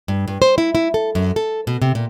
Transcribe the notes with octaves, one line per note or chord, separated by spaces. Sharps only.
G2
G2
C5
E4
E4
A4
F#2
A4
B2
C3
A#2